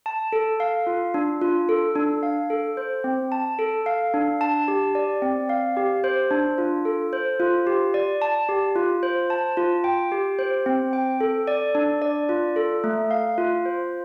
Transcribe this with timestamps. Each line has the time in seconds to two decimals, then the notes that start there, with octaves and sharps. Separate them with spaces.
0.06 A5
0.33 A4
0.60 F5
0.87 F4
1.14 D4
1.41 F4
1.69 A4
1.95 D4
2.23 F5
2.50 A4
2.77 C5
3.04 C4
3.32 A5
3.59 A4
3.86 F5
4.14 D4
4.41 A5
4.68 G4
4.95 D5
5.22 C4
5.49 F5
5.77 G4
6.04 C5
6.31 D4
6.58 F4
6.85 A4
7.13 C5
7.40 F4
7.67 G4
7.94 D5
8.22 A5
8.49 G4
8.76 F4
9.03 C5
9.30 A5
9.57 F4
9.84 G5
10.12 G4
10.39 C5
10.66 C4
10.93 G5
11.21 A4
11.47 D5
11.75 D4
12.02 D5
12.29 F4
12.56 A4
12.84 A3
13.11 F5
13.38 F4
13.65 C5